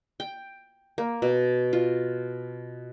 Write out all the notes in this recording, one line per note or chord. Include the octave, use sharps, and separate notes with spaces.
G5
A#3
B2
F4